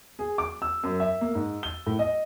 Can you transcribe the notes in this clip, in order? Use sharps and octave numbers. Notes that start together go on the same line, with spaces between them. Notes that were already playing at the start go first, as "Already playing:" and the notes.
G#4
D6
E6
F#2
E5
A#3
G#2
G7
A2
D#5